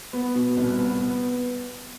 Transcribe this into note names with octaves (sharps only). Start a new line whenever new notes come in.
B3
B2
C2
B3
B3